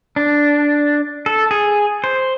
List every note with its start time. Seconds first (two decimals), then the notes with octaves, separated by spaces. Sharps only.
0.16 D4
1.26 A4
1.51 G#4
2.04 C5